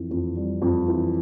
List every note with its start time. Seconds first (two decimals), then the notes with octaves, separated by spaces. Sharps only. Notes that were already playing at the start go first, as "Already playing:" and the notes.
Already playing: F2 E3
0.11 F2
0.37 G3
0.62 F2
0.88 E3